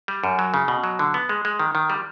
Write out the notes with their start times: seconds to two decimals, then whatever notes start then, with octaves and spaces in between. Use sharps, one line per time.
0.08 G3
0.24 F#2
0.39 F#3
0.54 C#3
0.68 B2
0.84 F#3
0.99 D3
1.14 B3
1.29 G#3
1.45 G#3
1.59 D#3
1.75 D#3
1.90 G3